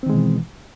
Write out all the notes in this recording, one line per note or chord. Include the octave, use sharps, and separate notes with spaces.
B2 D#3 E3 G#3 C4